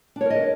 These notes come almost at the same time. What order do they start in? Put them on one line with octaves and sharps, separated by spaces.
D4 C#5 A#4 D#5